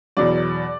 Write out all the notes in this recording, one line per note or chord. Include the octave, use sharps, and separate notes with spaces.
E2 B2 F#3 D5